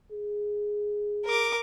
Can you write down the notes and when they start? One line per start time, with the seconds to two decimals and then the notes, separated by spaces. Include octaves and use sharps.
0.12 G#4
1.26 A#4 D6